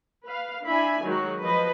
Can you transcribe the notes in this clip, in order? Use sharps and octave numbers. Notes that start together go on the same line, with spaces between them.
B4 F5
D4 E4 E5 G#5 B5
D#3 F#3 G#3 F#4
F3 B4 D#5